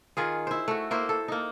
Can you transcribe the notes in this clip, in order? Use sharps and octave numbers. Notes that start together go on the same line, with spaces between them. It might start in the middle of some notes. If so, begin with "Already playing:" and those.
D#3 F4 G#4
E4 C5
A3 F#4
A#3 E4 C5
A4
A#3 D#4